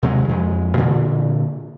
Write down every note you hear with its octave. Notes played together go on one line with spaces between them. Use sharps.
D#2 C3 F#3 G#3
F2 G#3
A#2 D3 E3